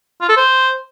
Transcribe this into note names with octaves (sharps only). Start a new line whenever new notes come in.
F4
A4
C5